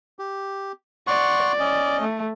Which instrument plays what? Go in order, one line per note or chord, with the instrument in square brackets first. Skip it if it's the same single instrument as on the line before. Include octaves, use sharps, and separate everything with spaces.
[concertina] G4
[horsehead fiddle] D5 [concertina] F#5 C6 C#6
[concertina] C#4 D#5
[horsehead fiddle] A3